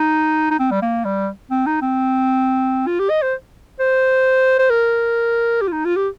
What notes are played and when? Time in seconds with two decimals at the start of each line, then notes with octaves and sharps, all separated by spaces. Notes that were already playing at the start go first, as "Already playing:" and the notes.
Already playing: D#4
0.51 D#4
0.59 C4
0.71 G3
0.82 A#3
1.05 G3
1.51 C4
1.66 D#4
1.81 C4
2.87 F4
2.99 G4
3.10 D#5
3.22 C5
3.79 C5
4.59 C5
4.70 A#4
5.61 G4
5.68 F4
5.72 D#4
5.85 F4
5.96 G4